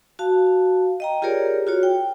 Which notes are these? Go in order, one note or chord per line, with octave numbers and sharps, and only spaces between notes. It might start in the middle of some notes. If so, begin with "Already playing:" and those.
F#4 F5 A5
D#5 G5 A#5
F4 G4 G#4 A#4 C#5 D5
F4 F#4 C#5
G5